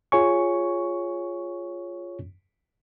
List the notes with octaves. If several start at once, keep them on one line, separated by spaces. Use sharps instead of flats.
F4 G#4 C#5 G#5 C#6